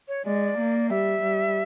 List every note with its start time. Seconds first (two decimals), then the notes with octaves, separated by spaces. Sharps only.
0.08 C#5
0.25 G#3 D5
0.58 A#3
0.90 G3 E5
1.22 G3